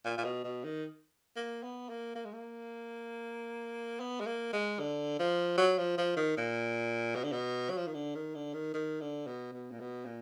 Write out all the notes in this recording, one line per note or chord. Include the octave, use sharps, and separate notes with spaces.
A#2
A#2
B2
B2
D#3
A#3
B3
A#3
A#3
G#3
A#3
B3
G#3
A#3
G#3
D3
F3
F#3
F3
F3
D#3
A#2
B2
D3
B2
F#3
F3
D#3
D3
D#3
D3
D#3
D#3
D3
B2
B2
A#2
B2
A#2